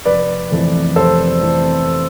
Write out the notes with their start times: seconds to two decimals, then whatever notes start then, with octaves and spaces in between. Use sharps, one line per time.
0.05 F1 B4 D5
0.50 F2 E3 A3 C4
0.96 F1 A4 C5
1.40 F2 E3 A3 C4